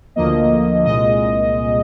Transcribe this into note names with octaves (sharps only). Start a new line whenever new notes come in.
D2 D3 F3 A#3 D#5
C2 A#2 G#3 D#5